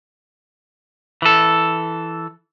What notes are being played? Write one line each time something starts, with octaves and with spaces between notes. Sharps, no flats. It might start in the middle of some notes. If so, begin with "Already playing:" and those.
E3 A4